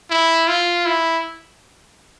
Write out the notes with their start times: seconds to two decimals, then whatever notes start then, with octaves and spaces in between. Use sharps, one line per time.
0.10 E4
0.48 F4
0.86 E4